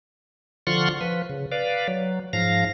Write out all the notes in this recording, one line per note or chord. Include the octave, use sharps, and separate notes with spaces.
D3 F3 F4 F#5 C6 C#6
F3 B4
C#3
B4 D5 F5
F#3
G#2 F3 F5 A#6